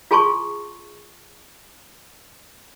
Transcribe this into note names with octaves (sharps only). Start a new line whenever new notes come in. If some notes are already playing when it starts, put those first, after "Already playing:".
F4 G#4 G#5 A5 C6 C#6